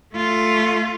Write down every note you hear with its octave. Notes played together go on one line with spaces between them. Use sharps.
A3 F4